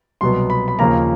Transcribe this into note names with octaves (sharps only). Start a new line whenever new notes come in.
C2 B2 F#3 B3 C6
B5
B5
D#2 C#3 F3 A#3 A#5